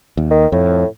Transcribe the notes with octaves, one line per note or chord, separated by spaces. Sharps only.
D#2
D#3
F2 A2